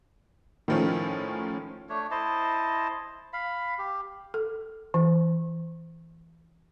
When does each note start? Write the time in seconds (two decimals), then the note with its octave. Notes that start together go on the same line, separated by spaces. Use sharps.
0.68 A2 D#3 F3 A3 C#4
1.89 A3 D4 C#5
2.11 E4 C5 D#5 A5
3.33 F5 B5
3.78 G4
4.34 A4
4.94 E3